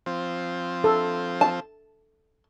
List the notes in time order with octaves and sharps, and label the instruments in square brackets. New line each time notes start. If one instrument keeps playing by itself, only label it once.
[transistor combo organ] F3 C4
[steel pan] A4
[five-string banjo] A5